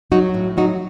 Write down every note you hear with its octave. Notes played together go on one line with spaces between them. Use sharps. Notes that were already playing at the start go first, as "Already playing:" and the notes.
F#3 D#4 F#4
A2
F#3 D#4 F#4